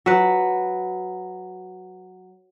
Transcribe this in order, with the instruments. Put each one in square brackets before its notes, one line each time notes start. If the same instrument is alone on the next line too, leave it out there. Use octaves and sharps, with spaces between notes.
[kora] F#3 B4